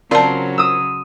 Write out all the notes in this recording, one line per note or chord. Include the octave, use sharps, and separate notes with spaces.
C#3 F#3 C4 F4 A#4 D5 A5 C6
D#6 E6